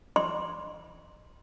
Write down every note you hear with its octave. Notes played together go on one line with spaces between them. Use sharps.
C6